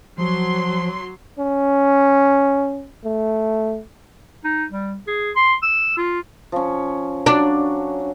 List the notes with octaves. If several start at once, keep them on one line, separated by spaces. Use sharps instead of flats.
F3 F#3 C6
C#4
A3
D#4
G3
G#4
C6
E6
F4
F3 C#4
F#3 D4